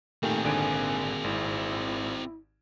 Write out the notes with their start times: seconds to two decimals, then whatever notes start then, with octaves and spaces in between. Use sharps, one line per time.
0.23 A#2 D#3 A3 C4 G4 G#4
0.44 G#1 D3 G#5 D7
1.24 G#1 E4